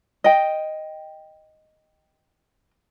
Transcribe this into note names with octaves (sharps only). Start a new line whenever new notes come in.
D#5 G5